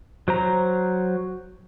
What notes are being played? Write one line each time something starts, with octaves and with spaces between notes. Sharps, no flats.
F#3 C5 A#5